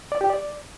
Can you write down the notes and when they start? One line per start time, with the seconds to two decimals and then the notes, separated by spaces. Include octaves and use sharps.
0.12 D5
0.21 G4
0.30 D5